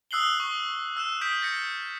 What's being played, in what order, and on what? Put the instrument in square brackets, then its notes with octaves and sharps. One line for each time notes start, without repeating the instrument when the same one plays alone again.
[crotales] D#6 E6 F#6 C7 F#7 G7
C#6 D#6
E6 F#6 E7
D#6 F6 G6 B6 D7
A6 A#6 C#7